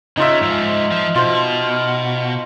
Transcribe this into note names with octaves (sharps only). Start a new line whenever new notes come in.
C#3 D#4 F4 E5
G#2 F3
F3
B2 F4 C5